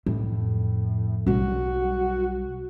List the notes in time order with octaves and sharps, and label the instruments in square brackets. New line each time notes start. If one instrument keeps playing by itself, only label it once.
[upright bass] F2 [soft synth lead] A2
[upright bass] B1 G3 [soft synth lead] F#4